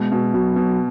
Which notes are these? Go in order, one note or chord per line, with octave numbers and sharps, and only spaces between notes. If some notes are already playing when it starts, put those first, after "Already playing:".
Already playing: B2 G#3
B2
B2 F#3
B2